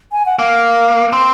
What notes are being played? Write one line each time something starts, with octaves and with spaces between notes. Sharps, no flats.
G#5
F#5
A#3 F5
C4 C6